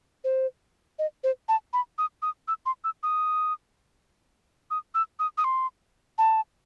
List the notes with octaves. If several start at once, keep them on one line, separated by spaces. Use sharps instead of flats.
C5
D#5
C5
A5
B5
D#6
D#6
E6
C6
E6
D#6
D#6
E6
D#6
D#6
C6
A5